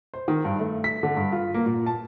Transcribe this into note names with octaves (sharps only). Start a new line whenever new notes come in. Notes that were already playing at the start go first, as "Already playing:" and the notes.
C5
D#3
G2
A3
B6
D3
G2
F4
A#3
A#2
A5